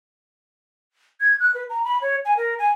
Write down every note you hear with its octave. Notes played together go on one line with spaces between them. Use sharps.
G#6
F#6
B4
A#5
B5
C#5
G#5
A#4
G#5